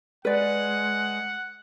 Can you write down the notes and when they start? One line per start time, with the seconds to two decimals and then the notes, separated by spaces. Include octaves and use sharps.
0.25 G#3 B4 D5 F#5